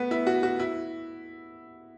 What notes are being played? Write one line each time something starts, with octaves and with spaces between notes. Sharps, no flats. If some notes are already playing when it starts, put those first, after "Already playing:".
Already playing: A3 B3
E4
F#4
F#4
E4